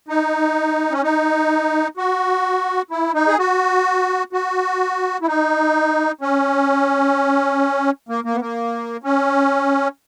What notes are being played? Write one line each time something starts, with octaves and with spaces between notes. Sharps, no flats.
D#4
C#4
D#4
F#4
E4
D#4
G#4
F#4
F#4
E4
D#4
C#4
A#3
A#3
B3
A#3
C#4